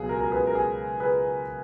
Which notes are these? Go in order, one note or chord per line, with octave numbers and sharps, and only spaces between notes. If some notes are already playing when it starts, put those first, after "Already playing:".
Already playing: C#2 B2 F#3 G#4
A#4
A#4
G#4 B4
A#4
G#4
G#4 B4